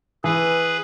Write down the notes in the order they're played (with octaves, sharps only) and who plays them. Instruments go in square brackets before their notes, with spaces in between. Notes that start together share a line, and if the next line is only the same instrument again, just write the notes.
[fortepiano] E3 [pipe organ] G#4 B4